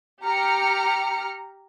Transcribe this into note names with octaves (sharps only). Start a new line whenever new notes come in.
G4 A#5 F6 C#7